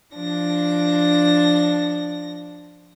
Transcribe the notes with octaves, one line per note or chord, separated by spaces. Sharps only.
F3 D4 A#6